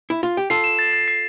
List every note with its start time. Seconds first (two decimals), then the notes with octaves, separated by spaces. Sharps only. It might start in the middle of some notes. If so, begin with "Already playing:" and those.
0.10 E4
0.23 F4
0.37 G4
0.50 F4 A4 C7
0.64 E7
0.79 A6
0.93 A6
1.08 C7